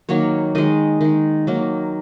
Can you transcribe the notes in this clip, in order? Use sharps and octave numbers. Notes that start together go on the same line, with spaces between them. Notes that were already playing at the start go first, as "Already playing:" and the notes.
D#3 F#3 A#3 C#5
D#3 G#3 D#5
D#3 G#3
D#3 F#3 A#3